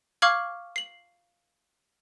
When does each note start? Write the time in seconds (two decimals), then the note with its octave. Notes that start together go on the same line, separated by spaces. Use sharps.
0.22 F5 C#6 D6 F6 G#6 F#7
0.76 C7 F#7